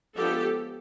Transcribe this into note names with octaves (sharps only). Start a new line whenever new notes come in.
F3 G#3 B3 D4 G4 A4